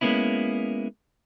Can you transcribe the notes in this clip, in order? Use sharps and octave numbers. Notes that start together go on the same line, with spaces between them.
G#3 A#3 B3 C#4 E4